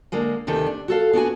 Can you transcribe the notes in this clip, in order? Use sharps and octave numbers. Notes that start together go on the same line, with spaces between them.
D3 G#3 A#3
D2 C3 D#3 A4
D4
F#4 A4 F5
B3 D4 F#4 G#5